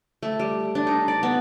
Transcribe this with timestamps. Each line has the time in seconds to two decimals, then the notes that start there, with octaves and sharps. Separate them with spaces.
0.23 A3
0.40 G3
0.75 D4
0.87 D#4
1.08 D5
1.23 B3